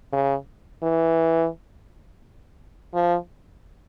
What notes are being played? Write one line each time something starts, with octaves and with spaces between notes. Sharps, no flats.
C#3
E3
F3